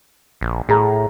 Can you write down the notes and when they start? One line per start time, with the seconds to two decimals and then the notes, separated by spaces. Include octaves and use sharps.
0.41 A#1
0.69 A2 G#4 A#5